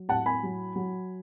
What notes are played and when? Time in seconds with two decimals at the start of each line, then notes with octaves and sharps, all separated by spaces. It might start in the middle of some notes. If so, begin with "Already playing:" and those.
Already playing: F#3
0.08 A2 F#5 A5
0.26 G#5 B5
0.43 F#3
0.76 F#3